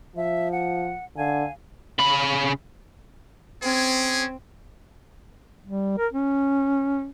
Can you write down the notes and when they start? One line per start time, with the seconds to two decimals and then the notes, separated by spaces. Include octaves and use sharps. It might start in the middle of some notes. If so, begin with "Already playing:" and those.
0.16 F3 E5
0.52 F#5
1.16 D3 F5 G#5
1.99 C#3 B5
3.63 C4 C#4 G#4
5.66 G3
5.98 A#4
6.13 C#4